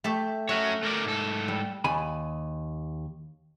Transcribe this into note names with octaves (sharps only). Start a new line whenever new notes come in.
A3 G4 E5
C#4 F#4 C#5 E5
A3 A#4 D5
G#2 A4
G3
D#2 G#5 B5